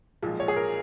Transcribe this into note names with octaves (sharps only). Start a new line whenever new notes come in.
B1 A#2 F3 G#3
C#5
G#4
A#4